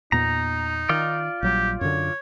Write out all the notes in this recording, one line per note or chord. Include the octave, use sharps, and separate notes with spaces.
E2 A#2 B3 D#4 A#5
D#3 F4 D5
A#1 F#3 G3 G4
F#2 D3 C#5